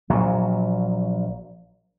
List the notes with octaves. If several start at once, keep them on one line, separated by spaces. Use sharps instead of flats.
A#1 A#2 F#3